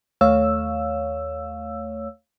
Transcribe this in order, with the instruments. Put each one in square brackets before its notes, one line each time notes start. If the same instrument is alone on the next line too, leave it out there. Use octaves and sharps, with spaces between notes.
[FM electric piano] D#2 A3 C#5 F5 E6